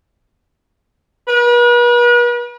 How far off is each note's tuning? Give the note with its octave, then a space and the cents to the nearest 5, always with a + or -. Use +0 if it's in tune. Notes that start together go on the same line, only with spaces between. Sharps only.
B4 -40